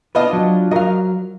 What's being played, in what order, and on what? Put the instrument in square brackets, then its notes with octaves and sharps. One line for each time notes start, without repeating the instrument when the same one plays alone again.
[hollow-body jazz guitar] B3 B4 [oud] D4 F4 D#5
[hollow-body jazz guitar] F#3
[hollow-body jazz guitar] F#3 A#4 [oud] D#5 F5